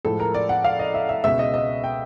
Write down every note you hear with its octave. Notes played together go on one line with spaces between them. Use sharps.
A2 F3 G#3 A4
A#4
D5
F#5
F5
D#5
E5
E5
C#2 B2 G#3 E5
D#5
D#5
G5